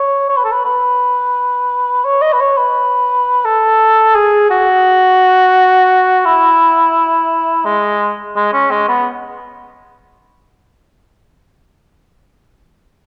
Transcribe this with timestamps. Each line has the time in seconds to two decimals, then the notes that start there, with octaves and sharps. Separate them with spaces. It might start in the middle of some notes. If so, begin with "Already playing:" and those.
Already playing: C#5
0.29 C#5
0.37 B4
0.44 A4
0.52 B4
0.65 B4
2.04 C#5
2.22 D#5
2.32 B4
2.40 C#5
2.57 B4
3.45 A4
4.15 G#4
4.50 F#4
6.25 E4
7.65 G#3
8.36 G#3
8.53 C#4
8.71 G#3
8.88 B3